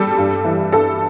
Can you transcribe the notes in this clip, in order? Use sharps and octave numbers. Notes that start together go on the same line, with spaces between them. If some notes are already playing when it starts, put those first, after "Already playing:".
Already playing: G3 A4
G2
E3
G2 A4